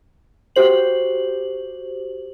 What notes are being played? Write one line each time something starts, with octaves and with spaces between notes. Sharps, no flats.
F#4 G4 C5 F#7